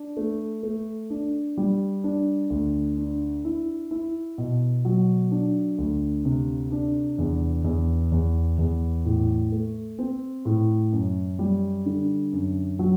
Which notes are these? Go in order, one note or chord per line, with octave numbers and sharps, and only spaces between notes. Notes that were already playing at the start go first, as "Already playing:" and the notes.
Already playing: D4
A3
A3
D4
G3
D4
D2
D4
E4
E4
B2
F#3
D4
D2
C3
D4
E2
E2
E2
E2
A2
A3
C4
A2
F#2
G3
D3
F#2
F#3